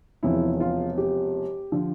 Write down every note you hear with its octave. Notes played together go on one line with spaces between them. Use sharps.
E1 E2 C3 F3 E4
F4
G4
D3 F3